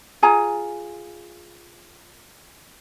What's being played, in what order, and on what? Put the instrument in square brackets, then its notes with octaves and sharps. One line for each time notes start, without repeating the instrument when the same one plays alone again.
[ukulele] F4 G#4 G#5 A#5